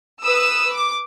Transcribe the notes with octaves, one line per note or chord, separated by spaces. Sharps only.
B4 D#6 E6
D6